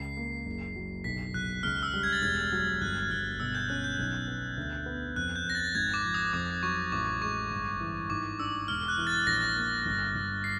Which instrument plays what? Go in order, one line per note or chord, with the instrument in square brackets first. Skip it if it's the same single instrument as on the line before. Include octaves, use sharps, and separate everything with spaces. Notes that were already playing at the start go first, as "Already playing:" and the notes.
Already playing: [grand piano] C#2 [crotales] C7
[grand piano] A#3
F#1
F#3
[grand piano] B1 [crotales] B6
[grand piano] B1 [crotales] F#6
[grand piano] C#2 [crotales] F6
[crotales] E6
[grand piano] G3
[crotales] G#6
A6
[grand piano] E1 [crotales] G#6
[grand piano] F#3
[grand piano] G1 [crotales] F#6
[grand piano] G1 [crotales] F6
[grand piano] B2 [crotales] E6
[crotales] G6
[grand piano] C#4 [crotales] F#6
[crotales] G6
[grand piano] B1
B3
D2
B3
[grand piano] F2 [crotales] F#6
[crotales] G6
[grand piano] F2 [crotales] A#6
[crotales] A6
[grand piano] G#1 [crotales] G#6
[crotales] D6
[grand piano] F3
[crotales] D#6
[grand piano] F2 [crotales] D6
[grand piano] F#3 [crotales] C#6
[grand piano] A1 [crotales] D6
[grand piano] G#3 [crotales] C#6
[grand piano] G1
E3
[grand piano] G#2 [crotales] D6
[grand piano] D4 [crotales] E6
[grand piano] E1 [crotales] F6
[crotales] F#6
[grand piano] E3
[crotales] A6
[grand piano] A#1 [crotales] A#6
[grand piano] A#3
G1
G1
[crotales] C7